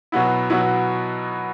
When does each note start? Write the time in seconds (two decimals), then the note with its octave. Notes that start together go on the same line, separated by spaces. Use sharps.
0.12 B2 F#3 B3 E4
0.50 B2 F#3 B3 E4